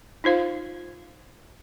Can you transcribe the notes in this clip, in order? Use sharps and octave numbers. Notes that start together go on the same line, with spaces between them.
D#4 F4 C5 F5